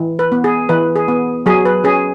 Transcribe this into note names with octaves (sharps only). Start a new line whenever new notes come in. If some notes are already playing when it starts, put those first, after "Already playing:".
Already playing: E3
B4
B3
G#4
E3 B4
G#4
B3
F#3 G#4
B4
C#4 G#4